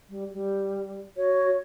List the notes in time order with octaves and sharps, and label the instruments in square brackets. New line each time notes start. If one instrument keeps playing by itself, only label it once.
[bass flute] G3
G3
[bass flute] F#4 [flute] C#5